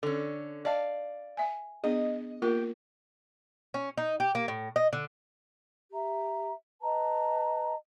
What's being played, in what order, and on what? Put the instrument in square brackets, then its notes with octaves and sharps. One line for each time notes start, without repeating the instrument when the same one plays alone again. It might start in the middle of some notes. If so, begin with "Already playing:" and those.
[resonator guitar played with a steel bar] D3 C#4 [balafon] A4
[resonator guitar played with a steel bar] D5 F5 [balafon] D#5 A5
[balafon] E5 G#5
[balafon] B3 D4 G#4 [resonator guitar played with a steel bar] D#5
[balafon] A#3 F4 A#4 [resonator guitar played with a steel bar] G4
[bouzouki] C#4
D#4
G4
A#3
A2
D#5
D3
[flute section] G4 E5 A#5
B4 D#5 A5 A#5